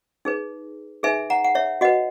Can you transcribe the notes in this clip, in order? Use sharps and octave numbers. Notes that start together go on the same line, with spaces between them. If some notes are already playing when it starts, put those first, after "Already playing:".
D#4 G#4 B4
D#4 G#4 B4 E5 G#5
F#5 A#5
F#5
C#5 E5
F#4 B4 D#5 F#5